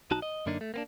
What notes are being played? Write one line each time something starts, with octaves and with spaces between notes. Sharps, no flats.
B1 D#4 F#4 A5
D#5
F#2 D3 A#3 D4 D#4
A3
A#3 B3 D4